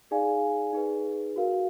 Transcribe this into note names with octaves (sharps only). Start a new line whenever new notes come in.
D#4 G#4 D5 F5 G#5
D#4 G#4 B4
F#4 A#4 F5